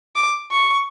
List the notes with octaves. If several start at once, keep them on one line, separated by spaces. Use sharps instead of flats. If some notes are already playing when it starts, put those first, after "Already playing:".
D6
C#6